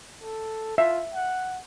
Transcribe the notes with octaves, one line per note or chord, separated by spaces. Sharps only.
A4
F4 E5
F#5